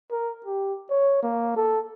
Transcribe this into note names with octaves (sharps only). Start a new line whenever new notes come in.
A#4
G4
C#5
A#3
A4